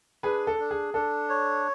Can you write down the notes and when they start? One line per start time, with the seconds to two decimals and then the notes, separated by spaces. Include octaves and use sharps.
0.23 D4 G#4 B4
0.47 A4
0.60 D4
0.71 G#4
0.94 D4 A4
1.29 C#5